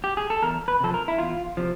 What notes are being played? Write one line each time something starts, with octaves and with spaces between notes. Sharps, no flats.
G4
G#4
A4
E2 A#4
B4
C3 F3 A4
A#4
E4
E2 F4
C3 F3